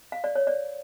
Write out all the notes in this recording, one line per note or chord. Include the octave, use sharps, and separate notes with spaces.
F5
D5
C#5
D5